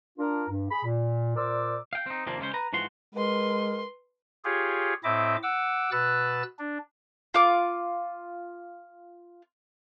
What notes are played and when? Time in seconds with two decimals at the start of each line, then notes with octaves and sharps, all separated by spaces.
0.18 D4 F4 A#4
0.49 G2
0.71 G#4 B5
0.84 A#2
1.36 A#2 A#4 C5 D5 D6 E6
1.93 F5 G5
2.06 C4 D#4
2.26 D#2 C3 F3 A#3 C4 D4
2.39 C#3 G#3 C#4 C5
2.54 B4 A#5
2.73 G#2 E3 F3 F#4 C6
3.14 G#3 A#4 B4 C6
4.45 F4 G4 G#4 C#5
5.04 A2 C4 E4 D#5 E5 D6
5.43 F#5 D6 E6
5.92 B2 B4 E6 F#6 A6
6.59 D4
7.34 F4 D6